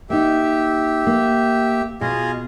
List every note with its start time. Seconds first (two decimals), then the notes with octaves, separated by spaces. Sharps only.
0.10 A#3 D#4 G4 E5
1.07 A#3
2.01 B2 F4 G#4 D#5